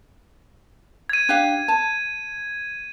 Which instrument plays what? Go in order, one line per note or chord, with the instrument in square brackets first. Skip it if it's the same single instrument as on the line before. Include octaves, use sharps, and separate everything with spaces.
[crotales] G#6 D#7
[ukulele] D4 G4 F5
A5